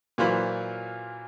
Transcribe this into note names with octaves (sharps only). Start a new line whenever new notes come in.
A#2 E3 F#3 F4 C5 B5